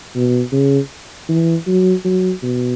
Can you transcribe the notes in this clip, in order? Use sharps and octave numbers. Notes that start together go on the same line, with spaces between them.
B2
C#3
E3
F#3
F#3
B2